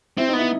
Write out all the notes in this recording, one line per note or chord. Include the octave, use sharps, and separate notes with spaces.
C4 E4
D#4
B3 E4